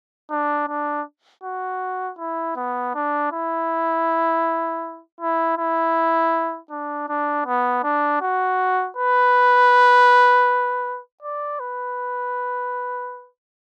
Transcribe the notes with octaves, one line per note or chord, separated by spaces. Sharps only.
D4
D4
F#4
E4
B3
D4
E4
E4
E4
D4
D4
B3
D4
F#4
B4
D5
B4